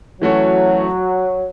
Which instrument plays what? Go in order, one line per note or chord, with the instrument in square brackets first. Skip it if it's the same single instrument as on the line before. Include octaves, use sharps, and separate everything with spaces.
[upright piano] E3 A3 C#4 F#4 C#5 [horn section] F#3